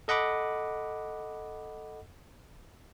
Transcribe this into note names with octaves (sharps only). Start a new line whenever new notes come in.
A4 D#5 F#5 B5 D6